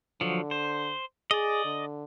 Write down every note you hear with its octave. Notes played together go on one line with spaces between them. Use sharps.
D3 F3 F#3
C5
G#4 D5 D#5
D3